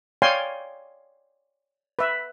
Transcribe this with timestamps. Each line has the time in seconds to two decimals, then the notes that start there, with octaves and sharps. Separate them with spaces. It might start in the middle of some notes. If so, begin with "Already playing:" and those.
0.22 C#5 D5 F5 G5 G#5 C6
1.99 B4 E5